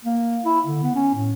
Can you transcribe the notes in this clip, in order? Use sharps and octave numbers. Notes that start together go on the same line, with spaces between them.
A#3
E4
D3
B3
C#4
A2